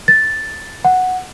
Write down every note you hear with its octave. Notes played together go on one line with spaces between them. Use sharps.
A6
F#5